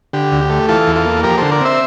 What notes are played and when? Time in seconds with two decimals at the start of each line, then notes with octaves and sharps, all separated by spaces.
0.13 D3 G4
0.32 D2
0.41 G4
0.50 A3
0.69 E3 F4 A4
0.88 E2
0.96 F4 A4
1.05 A#3
1.23 F3 G4 A#4
1.38 D3 A4 C5
1.52 A#4 D5
1.61 C4 C5 E5